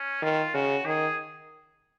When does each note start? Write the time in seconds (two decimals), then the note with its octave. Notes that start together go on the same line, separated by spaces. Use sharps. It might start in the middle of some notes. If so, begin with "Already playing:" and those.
Already playing: C#4
0.22 D#3 F4
0.54 C#3 F#4
0.85 D#3 G#4